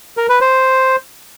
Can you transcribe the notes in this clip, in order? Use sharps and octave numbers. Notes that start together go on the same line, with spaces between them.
A#4
B4
C5